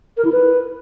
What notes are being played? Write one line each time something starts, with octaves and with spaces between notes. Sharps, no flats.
A#4
E4
B4